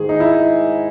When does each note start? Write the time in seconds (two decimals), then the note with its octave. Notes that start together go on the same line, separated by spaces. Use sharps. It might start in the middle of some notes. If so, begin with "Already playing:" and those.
Already playing: G#2 D#3 G#4
0.09 D#4
0.20 E4